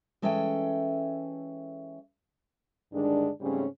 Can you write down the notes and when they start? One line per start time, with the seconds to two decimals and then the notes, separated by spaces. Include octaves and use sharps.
0.22 E3 G#3 C#4 A4 E5 G5
2.92 G2 D3 D#3 G#3 D4
3.41 G#2 C#3 G3 A3 C4 C#4